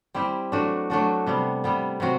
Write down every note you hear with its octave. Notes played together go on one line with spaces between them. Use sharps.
G3 C4 E4 G4
F#3 A3 D4 F#4
F#3 A3 D4 F#4
C3 G3 B3
C3 G3 B3
C3 F#3 C4 F#4